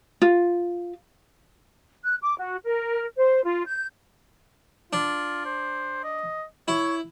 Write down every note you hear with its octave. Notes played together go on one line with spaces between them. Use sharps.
F4
F#6
D6
F#4
A#4
C5
F4
G6
D4 F4
C5
D#5
E4 C#5